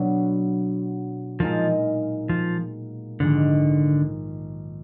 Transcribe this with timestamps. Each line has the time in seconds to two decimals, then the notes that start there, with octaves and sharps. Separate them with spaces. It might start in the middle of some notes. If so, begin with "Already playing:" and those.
Already playing: B2 F#3 B3 D4
1.40 A#2 F3 G#3 D#4 A#4
2.29 F3
3.20 A#1 G#2 D3 D#3